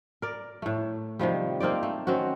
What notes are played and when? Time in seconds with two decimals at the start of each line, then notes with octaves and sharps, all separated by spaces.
0.22 A#4 D5
0.62 A2 A3
1.19 C3 D#3 F3 G3
1.60 A#3 C4 D#4 D5
1.83 A3
2.07 D#3 C4 C#4 F#4